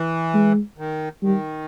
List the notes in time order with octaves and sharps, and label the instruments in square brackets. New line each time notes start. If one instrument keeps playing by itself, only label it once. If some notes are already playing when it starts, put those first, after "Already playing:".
Already playing: [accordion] E3
[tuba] G#3
[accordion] D#3
[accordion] D#3 [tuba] G3